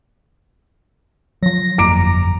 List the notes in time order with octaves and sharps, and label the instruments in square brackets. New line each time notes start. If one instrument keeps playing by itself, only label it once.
[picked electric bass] F3 F#3 [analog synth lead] A#6
[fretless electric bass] G1 F2 A#3 [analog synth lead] A#5 [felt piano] D6 D7